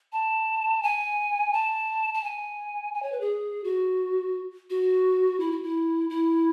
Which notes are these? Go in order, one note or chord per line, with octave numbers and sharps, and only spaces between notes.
A5
G#5
A5
A5
G#5
G#5
C#5
B4
G#4
F#4
F#4
E4
F#4
E4
E4